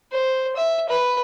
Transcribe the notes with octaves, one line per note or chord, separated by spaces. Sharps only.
C5
E5
B4